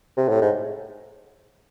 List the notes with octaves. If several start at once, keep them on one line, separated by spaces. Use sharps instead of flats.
C3
A2
G#2